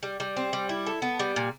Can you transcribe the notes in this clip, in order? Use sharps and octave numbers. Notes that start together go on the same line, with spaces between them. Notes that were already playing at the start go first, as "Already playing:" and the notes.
G3
G3
C4
G3
E4
A4
B3
G3
A#2